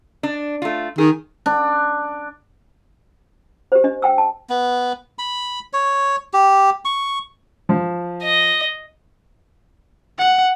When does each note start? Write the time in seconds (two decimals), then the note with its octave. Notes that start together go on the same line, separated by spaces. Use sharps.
0.23 D4
0.62 A3 F4
0.98 D#3 G#4
1.46 D4
3.72 G4 C5
3.84 D4 D#5
4.02 G5 G#5 E6
4.18 A5
4.49 B3
5.19 B5
5.73 C#5
6.33 G4
6.85 C#6
7.69 F3
8.23 D#5
10.19 F#5